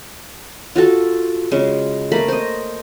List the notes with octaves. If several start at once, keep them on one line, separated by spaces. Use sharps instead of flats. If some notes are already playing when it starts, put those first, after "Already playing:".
F4 F#4 A4
C#3 G#3
A3 A#3 B5
C5 D#5